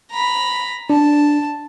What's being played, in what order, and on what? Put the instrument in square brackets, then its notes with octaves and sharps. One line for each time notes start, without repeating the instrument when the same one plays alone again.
[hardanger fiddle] A#5 B5
[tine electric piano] D4 [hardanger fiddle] A5